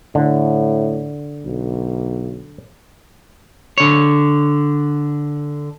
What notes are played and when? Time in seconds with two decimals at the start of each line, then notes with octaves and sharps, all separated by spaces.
0.15 A2 D3
1.45 B1
3.78 D3 C#5